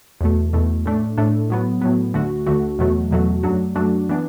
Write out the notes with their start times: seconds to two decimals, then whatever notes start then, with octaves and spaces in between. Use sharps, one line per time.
0.21 E2 B2 A3
0.53 E2 B2 A3
0.85 A2 A3 D4
1.18 A2 A3 D4
1.50 A2 F#3 B3
1.81 A2 F#3 B3
2.14 D2 D3 A3 F#4
2.46 D2 D3 A3 F#4
2.79 E2 B2 F#3 A3 F#4
3.11 E2 B2 F#3 A3 F#4
3.43 F#2 F#3 A3 D4 F#4
3.75 F#2 F#3 A3 D4 F#4
4.09 E3 B3 D4